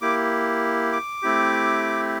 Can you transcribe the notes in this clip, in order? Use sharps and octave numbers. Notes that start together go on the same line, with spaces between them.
A#3 E4 G4 D6
D6
A3 C4 E4 G4